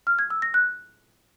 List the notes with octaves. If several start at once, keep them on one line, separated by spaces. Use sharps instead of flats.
F6
G#6
E6
A#6
F#6